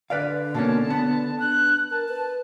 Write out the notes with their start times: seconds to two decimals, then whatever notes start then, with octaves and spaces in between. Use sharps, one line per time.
0.10 D3 B4 D5 F5
0.54 B2 A#3 C#4 A5
0.90 B3
1.39 D4 F#6
1.91 A#4 A5
2.09 B4